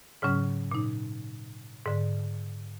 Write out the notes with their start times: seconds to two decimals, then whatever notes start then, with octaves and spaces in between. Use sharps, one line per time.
0.22 G#2 C#3 F#3 C#4 F6
0.71 A#2 D#4
1.86 G#2 D3